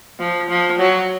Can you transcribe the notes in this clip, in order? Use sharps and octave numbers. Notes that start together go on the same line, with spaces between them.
F3
F3
F#3